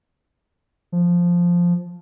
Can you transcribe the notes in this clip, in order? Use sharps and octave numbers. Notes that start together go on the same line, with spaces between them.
F3